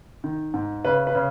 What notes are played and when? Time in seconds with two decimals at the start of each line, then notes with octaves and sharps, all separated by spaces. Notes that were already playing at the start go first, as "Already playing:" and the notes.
0.24 D#3
0.54 G#2
0.85 C#3 B4
1.07 B4
1.15 C#3